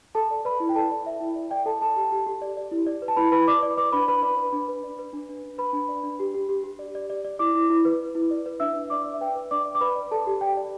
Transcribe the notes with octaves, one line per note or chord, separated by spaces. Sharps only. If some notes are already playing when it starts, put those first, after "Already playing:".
A4 A5
D5
B4 D5 B5
E4
G5
A4 D5 A5
D5
D5 E5
E4
D5
D5 G5
A4 D5 A5
A4 D5 A5
G4
G4
G4
D5
D5
E4
D5
B4
A5
E4 B4 B5
E4 B4 B5
D5 D6
D5
B4 D5 D6
D4 B4 B5
B4 B5
B4 D5 B5
B4
D4
B4
D5
B4
D4
D4
D4
B4 B5
D4
D5
D4
G4
G4
G4
G4
D5
D5
D5
D5
E4 D5 D6
E4
E4
B4
B4
E4
D5
B4
D4 E5 E6
D4
D4 D5 D6
D5
E5
B4 G5
B4
D4 D5 D6
D5
D6
B4 D5 B5
D5
A4 D5 A5
G4
D5 G5
D5